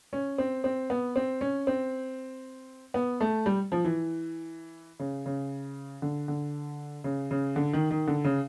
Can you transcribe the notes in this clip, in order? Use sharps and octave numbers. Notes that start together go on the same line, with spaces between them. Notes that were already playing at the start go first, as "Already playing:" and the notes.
C#4
C4
C4
B3
C4
C#4
C4
B3
A3
G3
F3
E3
C#3
C#3
D3
D3
C#3
C#3
D3
D#3
D#3
D3
C#3